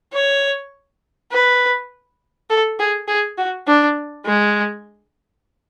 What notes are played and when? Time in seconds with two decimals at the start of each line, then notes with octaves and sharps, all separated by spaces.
0.13 C#5
1.32 B4
2.50 A4
2.79 G#4
3.08 G#4
3.38 F#4
3.67 D4
4.26 G#3